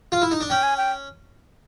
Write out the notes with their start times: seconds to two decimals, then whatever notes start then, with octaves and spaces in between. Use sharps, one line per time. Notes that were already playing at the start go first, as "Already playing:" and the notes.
0.12 F4
0.22 E4
0.31 D#4
0.40 D4
0.50 C#4 G5
0.63 G#5
0.77 G5